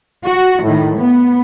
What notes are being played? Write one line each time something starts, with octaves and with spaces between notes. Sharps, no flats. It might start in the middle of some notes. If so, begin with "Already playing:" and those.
F#4
A2 D#3
B3